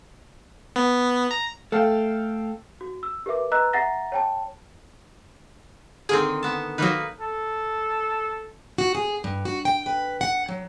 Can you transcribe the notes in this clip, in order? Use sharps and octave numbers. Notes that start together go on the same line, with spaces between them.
B3
A#5
A3 A4 F5 G5
F#4
E6
G4 A#4 B4 E5 D6
B4 D#5 A#5 E6 F#6
E5 F#5 A#5 A6 A#6
C#5 G5 A5
D3 D#3 C4 G#4
B3 A5
D#3 F#3 A#3 D#4 B4
A4
F#4
G#4
G2
F#4
G5
B4
F#5
F#3